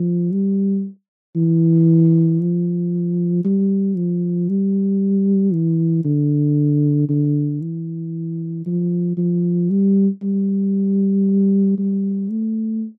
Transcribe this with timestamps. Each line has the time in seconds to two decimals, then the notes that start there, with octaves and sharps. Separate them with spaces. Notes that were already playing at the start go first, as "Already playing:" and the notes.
Already playing: F3
0.32 G3
1.36 E3
2.41 F3
3.45 G3
3.97 F3
4.49 G3
5.53 E3
6.05 D3
7.09 D3
7.62 E3
8.66 F3
9.17 F3
9.70 G3
10.23 G3
11.78 G3
12.30 A3